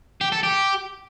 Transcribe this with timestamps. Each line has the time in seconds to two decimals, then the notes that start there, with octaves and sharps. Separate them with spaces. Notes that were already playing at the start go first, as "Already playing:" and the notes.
0.21 G4
0.32 A4
0.43 G4